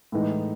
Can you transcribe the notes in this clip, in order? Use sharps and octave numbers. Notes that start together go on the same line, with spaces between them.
A2 E3 G#3 D#4